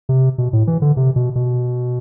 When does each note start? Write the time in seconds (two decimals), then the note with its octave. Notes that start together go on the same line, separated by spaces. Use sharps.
0.09 C3
0.38 B2
0.53 A2
0.67 E3
0.82 D3
0.97 C3
1.16 B2
1.36 B2